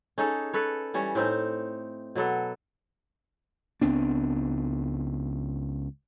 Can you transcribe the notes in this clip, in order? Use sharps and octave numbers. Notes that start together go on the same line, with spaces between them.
C#4 D#4 G#4 A4
A4 B4 C#5
E3 G3 C#4 C#5
A2 C4 D#4
B2 F#3 B3 A4
C#2 B3 C4 D4